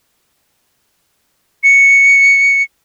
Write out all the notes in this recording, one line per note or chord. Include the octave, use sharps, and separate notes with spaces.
C#7